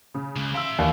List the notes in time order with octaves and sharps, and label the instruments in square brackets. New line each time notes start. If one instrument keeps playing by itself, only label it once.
[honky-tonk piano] C#3
[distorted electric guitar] C#2
[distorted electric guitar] E5 C6 [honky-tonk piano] F5 E6
[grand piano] D#2 [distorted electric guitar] E3 [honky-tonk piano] D5